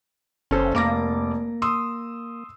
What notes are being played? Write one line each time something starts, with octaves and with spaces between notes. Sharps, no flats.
F#1 C#4 A4 C5
F1 A#3 D6 A#6
C6 D#6 E6